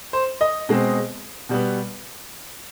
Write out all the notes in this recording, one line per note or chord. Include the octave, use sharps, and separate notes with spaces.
C5
D#5
B2 G#3 C4
B2 G3 B3